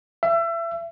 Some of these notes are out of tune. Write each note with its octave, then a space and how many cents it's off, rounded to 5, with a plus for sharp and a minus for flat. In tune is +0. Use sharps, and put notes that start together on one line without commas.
E5 +30